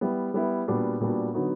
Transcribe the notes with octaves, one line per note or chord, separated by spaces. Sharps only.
G3 B3 E4
G3 B3 E4
A#2 G3 B3 D4 F#4
A#2 G3 B3 D4 F#4
D3 F#3 B3 D#4 F#4